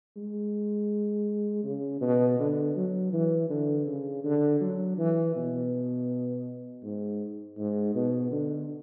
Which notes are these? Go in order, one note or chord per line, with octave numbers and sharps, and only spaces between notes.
G#3
C#3
B2
D3
F#3
E3
D3
C#3
D3
F#3
E3
B2
G#2
G#2
B2
D3